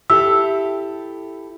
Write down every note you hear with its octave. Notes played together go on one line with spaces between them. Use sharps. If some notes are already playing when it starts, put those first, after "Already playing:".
E4 G4 A4 E6